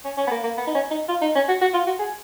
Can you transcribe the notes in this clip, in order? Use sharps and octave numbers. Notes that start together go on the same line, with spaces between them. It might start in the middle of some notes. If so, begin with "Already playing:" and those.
C#4
C#4
B3
A#3
A#3
B3
D#4
C#4
D#4
F4
D#4
C#4
F#4
F#4
F4
F#4
G#4